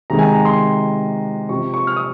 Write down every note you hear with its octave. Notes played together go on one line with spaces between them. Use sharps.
C3 D#3 G#3 A#5
G#5
A#5
C6
C3 F3 C4 C#6
C#6
F6
D#6